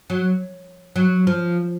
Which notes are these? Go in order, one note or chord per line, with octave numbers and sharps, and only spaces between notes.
F#3
F#3
F3